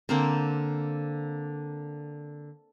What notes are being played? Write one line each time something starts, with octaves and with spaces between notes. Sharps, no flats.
D3 A#3 C4